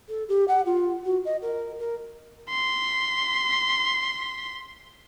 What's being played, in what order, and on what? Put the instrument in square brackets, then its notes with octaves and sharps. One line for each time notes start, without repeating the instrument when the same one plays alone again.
[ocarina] A4
G4
F#5
F4
F#4
D#5
A#4
A#4
[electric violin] C6 B6